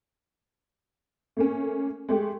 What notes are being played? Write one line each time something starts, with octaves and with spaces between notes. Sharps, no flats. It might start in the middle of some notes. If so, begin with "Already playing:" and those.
A3 A#3 C#4
G#3 A3 G4